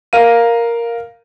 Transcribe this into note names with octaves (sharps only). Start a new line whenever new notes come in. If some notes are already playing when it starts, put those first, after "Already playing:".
A#4 F5 D#7